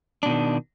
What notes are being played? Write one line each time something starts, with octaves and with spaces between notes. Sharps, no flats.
B2 D#3 D4